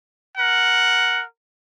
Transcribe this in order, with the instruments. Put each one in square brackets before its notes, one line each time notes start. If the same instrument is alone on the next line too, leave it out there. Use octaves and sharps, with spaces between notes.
[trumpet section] A#4 F#5